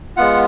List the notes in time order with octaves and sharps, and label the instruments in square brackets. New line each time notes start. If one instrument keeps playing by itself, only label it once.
[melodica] G#3 B3 F4 F#5